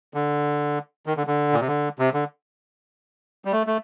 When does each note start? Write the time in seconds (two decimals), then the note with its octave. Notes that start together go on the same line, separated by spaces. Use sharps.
0.14 D3
1.06 D#3
1.17 D3
1.27 D3
1.53 A#2
1.60 C3
1.67 D3
1.99 C3
2.14 D3
3.45 G3
3.52 A3
3.67 A3